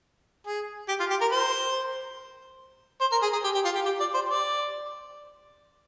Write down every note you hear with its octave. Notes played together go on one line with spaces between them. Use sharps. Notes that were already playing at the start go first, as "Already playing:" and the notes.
G#4
G4
F4
G4
A#4
C5
C5
A#4
G#4
G#4
G4
G4
F4
G4
G4
D5
C5
D5